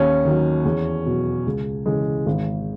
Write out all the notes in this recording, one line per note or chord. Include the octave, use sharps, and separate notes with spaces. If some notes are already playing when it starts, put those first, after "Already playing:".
Already playing: D#2 C#4
D#3 F#3
E2
B2 F#3
C#2
C#3 E3 G#3
G#1